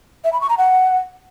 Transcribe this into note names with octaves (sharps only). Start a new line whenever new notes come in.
E5
B5
C#6
A#5
F#5